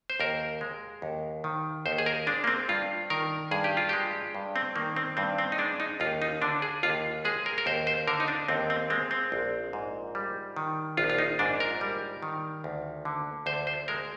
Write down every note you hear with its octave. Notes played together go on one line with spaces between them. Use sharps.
C5
D#2 A#4
G#3
D#2
D#3
D#2 C5
G#4
A#4
G#3 D4
A#3
C4
G2 F4
D#3 A#4
G2 G#4
G4
F4
G#3 G4
G2
C4
D#3 A#3
C4
G2 C4
C4
D#4
G#3 D4
D#4
D#2 F4
D#4
D3 D4
G#4
D#2 F4
G#3 G#4
A#4
A#4
D#2 C5
C5
D3 A#4
D#4
D4
D#2 C4
C4
G#3 C4
C4
A#1
G#2
G3
D#3
A#1 F4
F4
D#4
G#2 D4
A#4
G3
D#3
D2
D3
D2 C5
C5
G#3 A#4